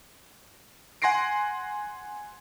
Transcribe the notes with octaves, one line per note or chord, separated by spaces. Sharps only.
F#5 G#5 C6 A#6 C7 D7